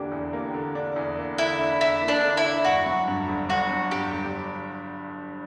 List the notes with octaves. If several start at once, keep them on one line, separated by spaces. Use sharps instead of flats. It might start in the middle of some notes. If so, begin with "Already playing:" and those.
Already playing: E2 D3 A#3 D4 G4
E2
A#3
D3
D4
E2
A#3
D3 E4
D4
E2 E4
A#3
D4
D3
E4
D4
G1 F#4
F#3
G2
G1
G1 F#4
F#3
G2 G4
G1